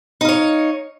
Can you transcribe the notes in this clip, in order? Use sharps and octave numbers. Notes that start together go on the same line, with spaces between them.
D#4 C#5 F5